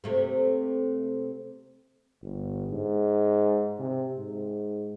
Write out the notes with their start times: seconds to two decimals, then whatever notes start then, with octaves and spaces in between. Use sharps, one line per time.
0.04 C3 A3 A#3
2.22 G1
2.71 G#2
3.79 C3
4.18 G#2